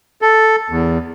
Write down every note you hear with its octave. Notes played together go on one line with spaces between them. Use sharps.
A4
E2